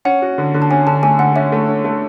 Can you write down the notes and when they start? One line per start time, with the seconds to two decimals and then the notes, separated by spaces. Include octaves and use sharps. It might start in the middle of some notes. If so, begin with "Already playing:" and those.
0.05 C#4 F#5
0.22 F#4
0.38 D3
0.54 D3
0.62 A5
0.71 C#4 G#5
0.87 D3 A5
1.03 A3 G#5
1.19 D3 F#5
1.35 C#4 E5
1.52 A3
1.68 C#4
1.84 A3